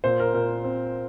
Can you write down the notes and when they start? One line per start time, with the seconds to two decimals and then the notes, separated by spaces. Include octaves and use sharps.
0.04 A#2 C5
0.20 A#4
0.34 A#2 A#4
0.64 C4